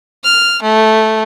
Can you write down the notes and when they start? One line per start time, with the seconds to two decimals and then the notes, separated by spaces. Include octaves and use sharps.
0.24 F6
0.62 A3